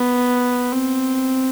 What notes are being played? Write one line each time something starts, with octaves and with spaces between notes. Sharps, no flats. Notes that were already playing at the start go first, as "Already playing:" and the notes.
Already playing: B3
C4